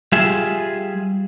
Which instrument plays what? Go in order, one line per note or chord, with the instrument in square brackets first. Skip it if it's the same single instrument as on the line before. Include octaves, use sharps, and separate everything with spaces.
[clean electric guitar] G3 F4 G#4 E5